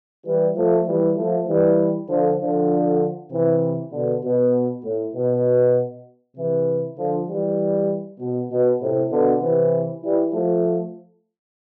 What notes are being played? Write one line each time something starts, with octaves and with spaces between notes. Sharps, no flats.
E3 G3
F3 A3
E3 G3
F3 A3
E3 G3
D3 F3
D3 F3
C3 E3
B2 D3
B2
A2
B2
C3 E3
D3 F3
E3 G3
B2
B2
A2 C3
B2 D3
C3 E3
E3 G3
F3 A3